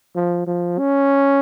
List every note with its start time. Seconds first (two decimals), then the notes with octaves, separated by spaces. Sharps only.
0.15 F3
0.47 F3
0.78 C#4